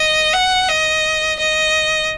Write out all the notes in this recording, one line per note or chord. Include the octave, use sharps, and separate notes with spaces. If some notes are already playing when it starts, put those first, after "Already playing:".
Already playing: D#5
F#5
D#5
D#5